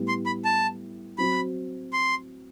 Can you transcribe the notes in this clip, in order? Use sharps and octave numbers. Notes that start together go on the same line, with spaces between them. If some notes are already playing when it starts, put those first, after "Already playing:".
Already playing: A2 G3 B3 E4
C6
B5
A5
F#3 C4 F#4 B5
C6